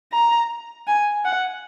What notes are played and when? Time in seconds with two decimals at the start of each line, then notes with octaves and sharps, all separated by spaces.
0.13 A#5
0.87 G#5
1.24 F#5